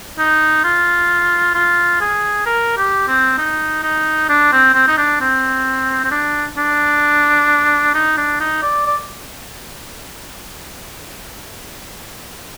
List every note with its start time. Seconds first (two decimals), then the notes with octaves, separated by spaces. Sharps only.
0.19 D#4
0.64 F4
1.55 F4
2.01 G#4
2.46 A#4
2.77 G4
3.08 C4
3.38 D#4
3.83 D#4
4.29 D4
4.53 C4
4.74 C4
4.88 D#4
4.98 D4
5.21 C4
6.04 C4
6.11 D4
6.57 D4
7.94 D#4
8.17 D4
8.40 D#4
8.62 D5
8.86 D5